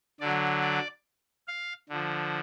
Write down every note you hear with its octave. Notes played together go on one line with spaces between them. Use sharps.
D3 F#3 D5
D5
F5
D3 F3